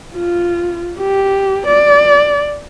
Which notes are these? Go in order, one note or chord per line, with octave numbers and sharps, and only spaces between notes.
F4
G4
D5